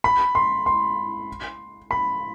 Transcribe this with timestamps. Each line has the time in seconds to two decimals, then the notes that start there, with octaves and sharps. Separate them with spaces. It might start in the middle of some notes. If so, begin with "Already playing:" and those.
0.04 B5
0.35 C6
0.66 C6
1.91 B5